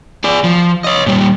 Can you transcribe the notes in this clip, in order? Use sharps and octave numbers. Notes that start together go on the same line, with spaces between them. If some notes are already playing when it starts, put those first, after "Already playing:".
G#4 D5
F3
C#5 D#5
A#2 G3